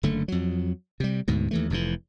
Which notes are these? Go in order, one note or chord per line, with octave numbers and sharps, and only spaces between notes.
F#1 D3 A3
F2 F#3
C3 G3
D2 G#2 B2
D#2 E3 A3
F1 F2 A2 E3